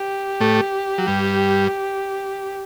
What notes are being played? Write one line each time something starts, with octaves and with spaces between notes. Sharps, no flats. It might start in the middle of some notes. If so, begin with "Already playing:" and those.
Already playing: G4
A2 A3
F#3
G2 G3